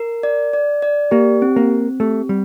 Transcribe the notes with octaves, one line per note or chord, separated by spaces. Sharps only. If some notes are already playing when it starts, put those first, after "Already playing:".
Already playing: A#4
D5
D5
D5
A#3 G4
C4
A#3
C4
A3 G4
G3 C4